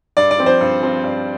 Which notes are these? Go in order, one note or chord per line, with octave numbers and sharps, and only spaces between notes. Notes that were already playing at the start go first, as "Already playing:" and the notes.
G2 D5
D5
F3 C4 F4
C5
G2
F3 C4 F4
G2